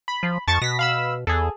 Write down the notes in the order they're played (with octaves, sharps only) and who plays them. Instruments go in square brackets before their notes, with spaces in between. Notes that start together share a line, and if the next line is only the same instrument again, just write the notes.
[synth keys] B5
[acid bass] F3
[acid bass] F2 [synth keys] A5 C#6 A6
[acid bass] B2 [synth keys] A#6 B6
[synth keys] F5 B5 E6
[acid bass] E2 [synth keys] G#4 A4